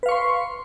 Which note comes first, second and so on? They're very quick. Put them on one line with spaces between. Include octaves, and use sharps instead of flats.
B4 F5 C#6 C6